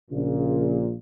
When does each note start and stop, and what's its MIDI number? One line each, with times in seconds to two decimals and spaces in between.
0.11 0.95 34
0.11 0.95 46
0.11 0.85 49